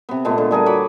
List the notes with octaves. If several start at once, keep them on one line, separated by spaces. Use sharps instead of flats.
C3 B3
A#2 G#3 A3 B3
D3
G3 G#4 A#4 G#5
F#4 C#5 B5 D6